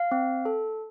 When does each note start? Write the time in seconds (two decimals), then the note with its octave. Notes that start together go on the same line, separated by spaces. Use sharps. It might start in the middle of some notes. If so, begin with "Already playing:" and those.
Already playing: F5
0.12 C4
0.45 A4